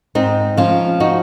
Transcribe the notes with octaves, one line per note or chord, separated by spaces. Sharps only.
G#2 C4 D#4
F3 C#4 F4
D#4 F#4